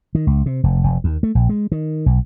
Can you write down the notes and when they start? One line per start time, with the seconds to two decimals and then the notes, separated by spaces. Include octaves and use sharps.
0.15 D#3
0.27 C#2
0.46 C3
0.64 F1
0.84 F1
1.04 D#2
1.23 A3
1.35 A#1
1.49 G#3
1.72 D#3
2.06 B1